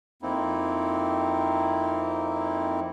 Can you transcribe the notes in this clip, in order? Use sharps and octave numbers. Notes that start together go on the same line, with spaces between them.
F2 A#3 C4 D#4 E4